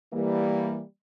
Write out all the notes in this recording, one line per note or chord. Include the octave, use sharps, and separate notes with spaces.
E3 G3 A#3